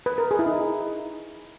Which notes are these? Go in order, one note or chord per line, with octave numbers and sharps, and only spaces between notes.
B4
A#4
G#4
E4
D#4